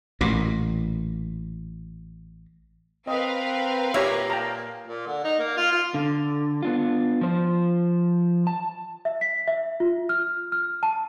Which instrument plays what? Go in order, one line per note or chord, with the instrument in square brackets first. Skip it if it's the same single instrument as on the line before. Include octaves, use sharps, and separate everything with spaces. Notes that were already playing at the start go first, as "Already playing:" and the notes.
[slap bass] A1 A#2
[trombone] C4 [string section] A#4 B4 F5 [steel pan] D#5
[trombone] A#2 [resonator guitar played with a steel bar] A#3 [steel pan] G4 C#5 E5
[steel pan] G5 A5 A#5
[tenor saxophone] A#2
D3
D#4
A#3
F4
F4
[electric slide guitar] D3
B3 D4 F4
F3 C5
A5
[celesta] E5
B6
E5
F4
F6
F6
A5